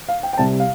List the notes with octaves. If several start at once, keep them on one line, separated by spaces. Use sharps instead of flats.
F5
G5
G5
C2 C3 G3 A5
F5